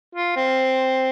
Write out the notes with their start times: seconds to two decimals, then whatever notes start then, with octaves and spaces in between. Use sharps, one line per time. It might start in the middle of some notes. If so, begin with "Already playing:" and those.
0.15 F4
0.36 C4